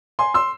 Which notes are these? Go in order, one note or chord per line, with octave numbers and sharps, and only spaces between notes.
G#5 C6
C6 E6